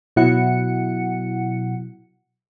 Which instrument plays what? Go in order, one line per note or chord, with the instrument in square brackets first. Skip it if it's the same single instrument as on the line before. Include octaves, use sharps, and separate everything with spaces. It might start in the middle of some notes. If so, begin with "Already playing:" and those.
[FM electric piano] B2 F#3 E4 F#5 C#7